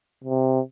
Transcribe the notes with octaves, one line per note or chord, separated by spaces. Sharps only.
C3